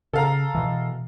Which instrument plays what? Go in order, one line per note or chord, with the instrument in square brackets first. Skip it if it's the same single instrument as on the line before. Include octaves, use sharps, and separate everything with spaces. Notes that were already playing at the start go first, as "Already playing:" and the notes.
[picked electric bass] C#3 [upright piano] A4 F5 A#5
[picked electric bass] B2 E3